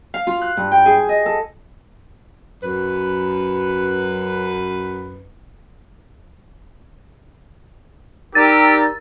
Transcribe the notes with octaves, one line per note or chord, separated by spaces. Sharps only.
F5
F4
F#6
G2
G5
G#4
D#5
A4
F#2 B4
G3 D#4 G4 A#4 E6 A6